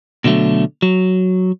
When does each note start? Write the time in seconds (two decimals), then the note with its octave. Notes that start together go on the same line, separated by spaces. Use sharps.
0.24 B2 D3 F#3 A3
0.82 F#3